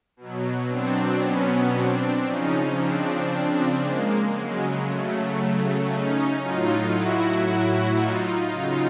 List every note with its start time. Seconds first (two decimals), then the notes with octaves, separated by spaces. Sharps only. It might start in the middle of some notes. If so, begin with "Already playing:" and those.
0.17 B2 F#3
0.68 C4 D4
1.20 B3 C#4
1.73 C4 D4
2.24 C#3 F3 C#4 D#4
2.77 C4 D4
3.81 G#3 A#3
4.33 C#3 F#3 G#3
4.85 A3
5.89 C#4 D#4
6.42 A2 F#3 D#4 F4
6.93 E4 F#4
7.98 D#4 F4
8.50 C#3 F#3